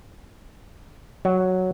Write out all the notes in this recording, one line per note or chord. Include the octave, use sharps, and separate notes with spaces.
F#3